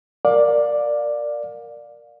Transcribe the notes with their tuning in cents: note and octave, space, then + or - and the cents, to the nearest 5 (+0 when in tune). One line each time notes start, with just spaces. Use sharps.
A#4 +0 D5 +5 F5 +25